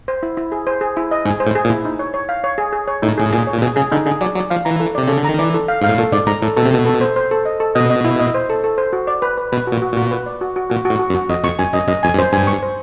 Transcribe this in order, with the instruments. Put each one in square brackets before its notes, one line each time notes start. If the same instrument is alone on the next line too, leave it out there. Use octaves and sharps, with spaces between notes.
[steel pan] C5
E4
E4
G#4
C5
G#4
E4
D#5
[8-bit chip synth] G#2 [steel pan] G#4
[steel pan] C5
[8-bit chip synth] A2
[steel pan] G#4
[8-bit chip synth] A#2
[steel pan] E4
D#4
C#5
C#5
F5
C#5
G#4
G#4
C#5
[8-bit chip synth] A2 [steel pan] D#4
[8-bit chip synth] A2 [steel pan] G#4
[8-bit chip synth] A#2 [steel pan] G#4
[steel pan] C#5
[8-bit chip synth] A#2
[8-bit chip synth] B2 [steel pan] G#4
[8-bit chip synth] C#3 [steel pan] G#4
[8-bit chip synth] D3 [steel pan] D#4
[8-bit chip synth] D3 [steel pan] G#4
[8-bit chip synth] F#3 [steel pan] D5
[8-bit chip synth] F#3 [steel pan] D5
[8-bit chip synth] F3 [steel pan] F5
[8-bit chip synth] E3 [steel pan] A#5
[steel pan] A4
[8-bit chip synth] C3 [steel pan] D5
[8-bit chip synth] C#3 [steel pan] A4
[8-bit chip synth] D3
[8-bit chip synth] D#3 [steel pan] A#5
[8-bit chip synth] E3 [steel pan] D5
[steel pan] A4
F5
[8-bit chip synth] G#2 [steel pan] F5
[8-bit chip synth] A2
[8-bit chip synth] A#2 [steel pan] A4
[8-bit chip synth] G#2 [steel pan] D5
[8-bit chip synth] G#2 [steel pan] A#5
[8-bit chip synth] A2 [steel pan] A4
[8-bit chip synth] B2 [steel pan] A4
[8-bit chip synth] C3
[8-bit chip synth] B2 [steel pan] A4
[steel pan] A4
C5
C5
A4
D#5
A4
[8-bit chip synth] B2 [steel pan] D#5
[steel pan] D#5
E4
D#5
C5
A4
A4
C5
F#4
D5
B4
B4
[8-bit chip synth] B2 [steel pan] B4
[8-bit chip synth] A#2 [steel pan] F#4
[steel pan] F#4
[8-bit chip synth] A#2
[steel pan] F#4
B4
D5
F#4
F#4
[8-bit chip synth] A#2 [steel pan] F#4
[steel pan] F#4
[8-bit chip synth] A2
[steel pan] F#4
[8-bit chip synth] F#2
[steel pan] F#4
[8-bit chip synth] F2 [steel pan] D#5
[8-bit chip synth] F2 [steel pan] C#6
[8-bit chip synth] F#2 [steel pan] G#5
[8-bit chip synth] F#2 [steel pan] D#5
[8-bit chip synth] F#2 [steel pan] D#5
[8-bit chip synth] F2 [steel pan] G#5
[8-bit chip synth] G2
[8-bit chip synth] F#2 [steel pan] C5
[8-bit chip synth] G2 [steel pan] G#5
[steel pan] C#6
C5